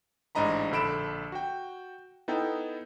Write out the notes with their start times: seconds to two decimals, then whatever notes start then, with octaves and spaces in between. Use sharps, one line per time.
0.35 A1 G#2 D4 D#5 A#5 B5
0.71 A#1 D3 A4 B5 D7 E7
1.32 F#4 G5
2.28 B3 D#4 E4 A4 G5